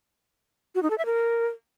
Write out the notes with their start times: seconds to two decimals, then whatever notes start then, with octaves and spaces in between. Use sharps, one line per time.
0.75 F#4
0.83 D#4
0.90 A4
0.98 E5
1.06 A#4